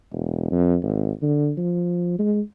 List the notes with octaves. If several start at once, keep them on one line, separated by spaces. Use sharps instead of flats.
E1
F2
G#1
D3
F3
G#3